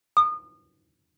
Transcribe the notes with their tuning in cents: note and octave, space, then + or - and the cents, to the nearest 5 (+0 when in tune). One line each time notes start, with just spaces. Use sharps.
D#6 -30